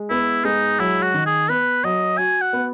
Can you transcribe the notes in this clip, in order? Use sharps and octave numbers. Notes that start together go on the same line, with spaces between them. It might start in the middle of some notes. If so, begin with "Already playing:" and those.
Already playing: G#3
B3 E4
G#3 D#4
F#3 E4
F#4
D#3
G#4
B3 B4
F#3 D#5
F#4 G#5
F#5
B3